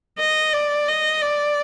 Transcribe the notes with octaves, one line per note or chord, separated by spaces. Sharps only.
D#5
D5
D#5
D5